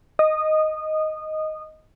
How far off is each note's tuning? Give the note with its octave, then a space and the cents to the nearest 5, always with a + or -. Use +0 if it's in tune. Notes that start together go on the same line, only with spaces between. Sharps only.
D#5 +0 D#6 -25